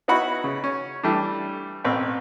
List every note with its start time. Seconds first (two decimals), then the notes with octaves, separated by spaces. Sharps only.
0.08 B3 D#4 E4 F#4 F#5 B5
0.44 C#3
0.64 C#4
1.03 E3 G3 A3 D4
1.84 A1 B2 C4 B4